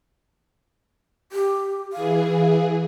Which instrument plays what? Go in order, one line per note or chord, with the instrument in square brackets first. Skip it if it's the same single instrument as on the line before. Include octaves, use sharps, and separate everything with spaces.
[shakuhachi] G4
[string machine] E3 G#4 [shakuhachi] F5